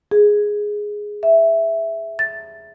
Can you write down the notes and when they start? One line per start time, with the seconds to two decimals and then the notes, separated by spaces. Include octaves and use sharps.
0.11 G#4
1.23 E5
2.19 A6